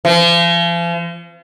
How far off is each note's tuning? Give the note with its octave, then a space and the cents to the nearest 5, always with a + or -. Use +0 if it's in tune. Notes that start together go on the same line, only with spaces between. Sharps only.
F3 -40